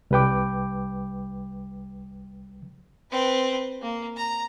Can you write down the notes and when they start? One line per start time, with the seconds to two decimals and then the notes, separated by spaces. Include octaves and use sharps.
0.11 C2 G3 B4 G5 D6
3.11 C4 B4
3.82 A#3
4.17 A#5